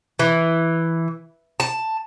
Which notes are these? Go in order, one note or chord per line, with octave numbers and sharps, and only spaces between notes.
E3
A5